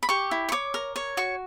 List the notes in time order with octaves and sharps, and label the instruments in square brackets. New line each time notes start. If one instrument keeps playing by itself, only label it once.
[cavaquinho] B5
G4 C#6
E4
C#6
C#5 D6
A#4
C#5
F#4 C#6